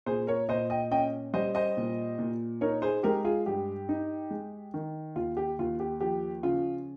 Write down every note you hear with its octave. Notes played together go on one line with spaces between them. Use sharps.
A#2 G#4 C5
A#4 C#5
A#2 C5 D#5
D#5 G5
C#4 D#5 G5
G3 C5 D#5
C5 D#5
A#2
A#2
D#4 A#4 C#5
G#4 C5
G#3 G4 A#4
F4 G#4
G2 G4
D#4
G#3
D#3
D#2 F4
G4
D#2 F4
G4
F3 G4
C#3 F4